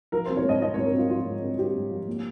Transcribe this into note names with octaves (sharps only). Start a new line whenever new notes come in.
F3 A#4
C4 C5
C#5
G#2 D#5
C4 D#5
G#2 C#5
A#4
C4 F4
F3 F4
G#2
C4
C4 G4
G#2
F3
A#3